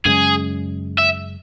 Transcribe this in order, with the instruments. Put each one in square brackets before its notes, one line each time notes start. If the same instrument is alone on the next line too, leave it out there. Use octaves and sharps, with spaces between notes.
[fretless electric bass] F#2 C#3 G#3 [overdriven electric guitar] G#4
[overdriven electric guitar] E5